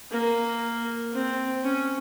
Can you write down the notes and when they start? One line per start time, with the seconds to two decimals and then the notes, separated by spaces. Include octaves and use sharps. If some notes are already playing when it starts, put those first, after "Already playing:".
0.11 A#3
1.13 C4
1.64 C#4